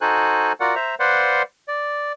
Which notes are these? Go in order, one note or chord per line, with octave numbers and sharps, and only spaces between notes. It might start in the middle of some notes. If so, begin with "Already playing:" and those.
D#4 F#4 A4 C5 G#5 F#6
F4 F#4 A#4 D5 F#5
C5 E5 A#5
B4 C5 D5 F5 F#5 C6
D5